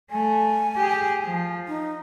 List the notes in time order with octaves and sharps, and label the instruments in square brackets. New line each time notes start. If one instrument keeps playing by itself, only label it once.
[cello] A3 [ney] G#5
[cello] G4 G#4
F3
[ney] D#4